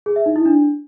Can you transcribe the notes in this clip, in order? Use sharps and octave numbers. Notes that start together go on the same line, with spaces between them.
G#4
E5
D#4
E4
D4